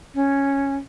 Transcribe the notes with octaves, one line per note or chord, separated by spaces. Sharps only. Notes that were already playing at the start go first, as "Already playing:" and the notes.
C#4